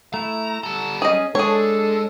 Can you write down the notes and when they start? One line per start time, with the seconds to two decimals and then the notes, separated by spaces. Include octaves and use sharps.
0.14 A3 E4 A#5
0.63 G3 A4 A#5
1.02 C#4 G#4 D#5
1.35 G#3 D4 G#4 A4 C#5